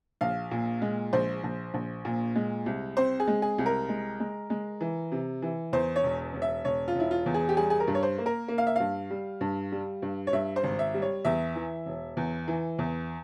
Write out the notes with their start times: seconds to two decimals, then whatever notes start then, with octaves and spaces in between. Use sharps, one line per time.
0.21 A#1 F5
0.51 A#2
0.82 G#3
1.13 A#1 C5
1.44 A#1
1.74 A#1
2.05 A#2
2.36 G#3
2.66 C2
2.97 C4 C5
3.20 G#4
3.27 G#3
3.42 G#4
3.58 C2
3.66 A#4
3.89 G#3
4.20 G#3
4.50 G#3
4.81 E3
5.12 C3
5.42 E3
5.73 E2 C5
5.96 C#5
6.04 E1
6.34 E1
6.42 E5
6.65 E1 C#5
6.88 F4
6.95 E1 E4
7.11 F4
7.26 E2
7.34 G#4
7.49 G4
7.57 G3 G#4
7.70 G#4
7.80 A#4
7.87 G2
7.95 C#5
8.03 C5
8.18 A#3
8.26 A#4
8.48 A#3
8.58 F5
8.67 E5
8.76 G2 F5
9.10 G3
9.41 G2
9.72 G3
10.02 G2
10.27 C#5
10.33 G2 E5
10.56 C5
10.63 G#1
10.79 E5
10.94 G3
11.02 C#5
11.25 E2 E5
11.55 E3
11.86 E1
12.17 E2
12.48 E3
12.79 E2